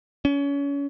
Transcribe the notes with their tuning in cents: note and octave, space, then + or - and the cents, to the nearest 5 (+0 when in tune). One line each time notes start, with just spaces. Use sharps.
C#4 +30